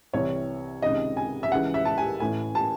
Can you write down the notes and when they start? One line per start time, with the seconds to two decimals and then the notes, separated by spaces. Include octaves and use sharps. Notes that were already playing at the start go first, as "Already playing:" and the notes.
0.13 C2 C3 E3 C#5
0.82 C#2 C3 D#3 D#5
1.17 G#5
1.43 E5
1.51 C#2 C#3 E3 F#5
1.74 E5
1.85 A5
1.98 G#5
2.20 A1 A2 E3 G#5
2.55 A5